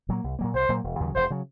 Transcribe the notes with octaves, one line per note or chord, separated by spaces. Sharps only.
A#2 F#3 A#3
C2
A#2 F#3 A#3
C2 C5
A#2 F#3 A#3
E1
D#2 C#3 F#3
E1 C5
C#3 F#3